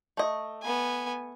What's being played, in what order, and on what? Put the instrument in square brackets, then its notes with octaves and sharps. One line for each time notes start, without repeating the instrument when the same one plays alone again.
[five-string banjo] A3 D#5
[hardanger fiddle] B3 G#5